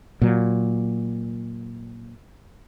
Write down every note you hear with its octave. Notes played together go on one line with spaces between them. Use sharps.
A#2 F#3